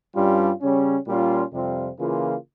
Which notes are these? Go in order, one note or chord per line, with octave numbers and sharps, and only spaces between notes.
G2 G3 C#4 F4
C#3 G3 C#4
A#2 G3 C#4 F4
F2 C3 G3 C4 F4
C#3 E3 A#3 F4